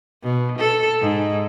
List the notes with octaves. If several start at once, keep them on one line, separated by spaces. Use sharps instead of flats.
B2
A4
G#2